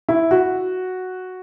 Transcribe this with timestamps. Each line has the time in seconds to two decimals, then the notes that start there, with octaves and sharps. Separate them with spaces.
0.09 E4
0.31 F#4